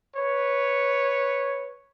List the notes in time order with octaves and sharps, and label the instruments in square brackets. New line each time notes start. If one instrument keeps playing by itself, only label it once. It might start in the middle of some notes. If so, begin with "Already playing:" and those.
[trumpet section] B4 C#5